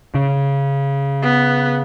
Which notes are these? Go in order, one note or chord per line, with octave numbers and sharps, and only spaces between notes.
C#3
B3